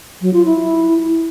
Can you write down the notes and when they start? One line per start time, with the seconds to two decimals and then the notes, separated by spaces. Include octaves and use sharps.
0.22 F#3
0.34 F4
0.45 E4